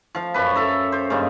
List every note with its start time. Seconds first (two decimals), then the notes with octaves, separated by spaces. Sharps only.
0.15 F3 F5
0.34 F#2 B4
0.55 A4 E5 A#5
0.92 C5
1.10 G2 C#3 A#3 D#4